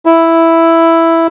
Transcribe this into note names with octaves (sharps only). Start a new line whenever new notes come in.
E4